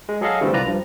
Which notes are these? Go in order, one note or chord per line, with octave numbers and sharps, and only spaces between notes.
G#3
F#3 G#4 A4 D#5 F5
D3 E3 G3 A3 C4
C2 F4 B4 D5 A#5
G2 F3